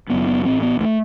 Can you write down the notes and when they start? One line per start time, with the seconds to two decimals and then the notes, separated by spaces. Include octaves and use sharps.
0.09 F#1 F#2 B3
0.26 B3
0.44 A1 A2 C4
0.62 B3
0.79 D#2 A3